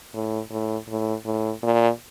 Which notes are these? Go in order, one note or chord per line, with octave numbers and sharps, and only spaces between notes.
A2
A2
A2
A2
A#2